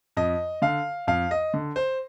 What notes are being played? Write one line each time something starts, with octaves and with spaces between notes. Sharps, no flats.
F2 D#5
D3 F5
F2 F5
D#5
D3
C5